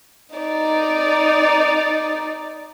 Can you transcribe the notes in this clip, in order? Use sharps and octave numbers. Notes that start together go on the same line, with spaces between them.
D#4 D5